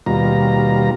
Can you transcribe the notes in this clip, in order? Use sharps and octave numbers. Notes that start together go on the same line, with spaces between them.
D#2 B2 G3 F4 A#5